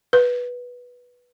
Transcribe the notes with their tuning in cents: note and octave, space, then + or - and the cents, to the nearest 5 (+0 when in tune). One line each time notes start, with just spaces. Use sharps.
B4 -10